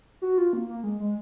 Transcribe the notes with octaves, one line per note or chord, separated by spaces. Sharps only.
F#4
F4
A#3
A#3
G#3
G#3